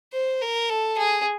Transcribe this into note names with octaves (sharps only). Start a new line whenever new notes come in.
C5
A#4
A4
G#4